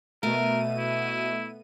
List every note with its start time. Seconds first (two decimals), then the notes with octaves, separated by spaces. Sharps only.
0.23 B2 A3 A#4 D#7
0.78 E4